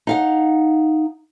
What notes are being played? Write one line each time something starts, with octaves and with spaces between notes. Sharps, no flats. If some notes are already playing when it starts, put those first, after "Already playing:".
D#4 F5 F#5